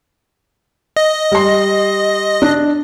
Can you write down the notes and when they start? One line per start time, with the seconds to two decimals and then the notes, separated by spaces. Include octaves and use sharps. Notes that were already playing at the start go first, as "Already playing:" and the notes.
0.97 D#5
1.32 G3 C6
2.42 D4